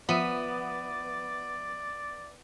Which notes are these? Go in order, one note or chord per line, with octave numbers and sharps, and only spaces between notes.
F3 B3 D5 E5 D#7